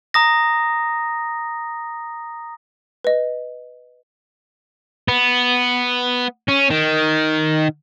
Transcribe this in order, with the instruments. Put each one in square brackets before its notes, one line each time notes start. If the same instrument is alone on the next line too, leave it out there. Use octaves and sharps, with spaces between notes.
[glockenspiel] A#5 D#6 A#6
[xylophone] B4 D#5
[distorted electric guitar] B3
C#4
D#3